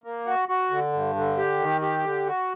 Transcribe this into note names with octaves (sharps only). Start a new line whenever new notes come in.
A#3
F#4
F#4
D3
G2
D3
G4
D#3
G4
D3
F#4